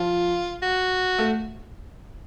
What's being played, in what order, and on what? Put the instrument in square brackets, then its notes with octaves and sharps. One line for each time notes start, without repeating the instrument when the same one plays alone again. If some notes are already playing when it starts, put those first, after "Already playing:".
Already playing: [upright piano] F3 [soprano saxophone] F4
[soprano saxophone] F#4
[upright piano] A3